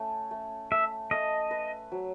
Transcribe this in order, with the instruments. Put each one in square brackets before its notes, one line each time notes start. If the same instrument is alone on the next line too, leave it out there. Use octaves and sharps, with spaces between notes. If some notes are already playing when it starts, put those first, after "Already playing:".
Already playing: [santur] A3 C#4
A3
[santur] A3 [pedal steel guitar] E5
[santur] A3 [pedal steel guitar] D#5
[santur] B4
F#3